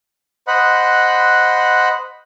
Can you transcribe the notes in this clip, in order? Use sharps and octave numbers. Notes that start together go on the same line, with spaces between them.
C5 D#5 F#5 B5 F#6